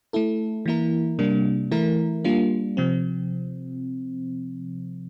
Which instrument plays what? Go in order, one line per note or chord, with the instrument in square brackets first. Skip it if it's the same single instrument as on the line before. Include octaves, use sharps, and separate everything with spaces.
[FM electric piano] A3 E4 A4
E3 A#3 E4 A#4
C3 G3 A#3 D4
E3 A3 E4 A#4
G3 A#3 D4 F4
C3 F3 C4